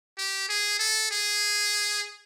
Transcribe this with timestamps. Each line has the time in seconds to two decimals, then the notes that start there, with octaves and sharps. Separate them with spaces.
0.18 G4
0.49 G#4
0.80 A4
1.11 G#4